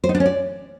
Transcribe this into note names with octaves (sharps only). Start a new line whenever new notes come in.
C5
D#4
D4
C#4
D5